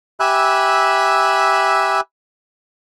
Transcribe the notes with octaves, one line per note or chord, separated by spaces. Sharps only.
G4 E5 G#5 B5 E6 F#6